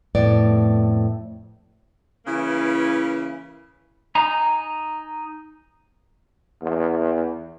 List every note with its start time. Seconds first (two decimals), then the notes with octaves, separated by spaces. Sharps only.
0.15 F2 A2 B3 D5
2.26 C#3 E3 A#3 E4 B4
4.15 D#4 G#5 A#5
6.62 E2